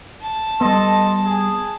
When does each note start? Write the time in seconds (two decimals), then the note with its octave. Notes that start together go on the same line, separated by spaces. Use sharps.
0.22 A5
0.61 G3 B3 A4 D#5 C6
1.24 G#4